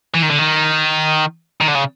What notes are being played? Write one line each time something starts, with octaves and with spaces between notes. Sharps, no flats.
E3
D#3
D3
D#3
D#3
D3
C#3